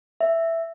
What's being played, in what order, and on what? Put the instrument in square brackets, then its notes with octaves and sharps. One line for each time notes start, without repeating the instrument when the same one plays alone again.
[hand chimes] E5